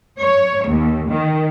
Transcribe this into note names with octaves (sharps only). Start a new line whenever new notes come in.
C#5
D#2
D#3